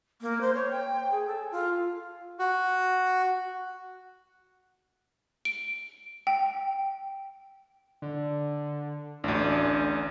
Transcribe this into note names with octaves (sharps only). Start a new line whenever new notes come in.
A#3
C5
C#5
G5
G#4
A4
F4
F#4
D7
G5
D3
A1 D2 D4